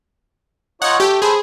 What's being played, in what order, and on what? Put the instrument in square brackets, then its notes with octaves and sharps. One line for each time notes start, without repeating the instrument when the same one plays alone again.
[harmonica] D#4 F4 C#5 [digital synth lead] F#5
[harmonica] A3 [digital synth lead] G4
[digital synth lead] G#4 [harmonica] A4 B4 C5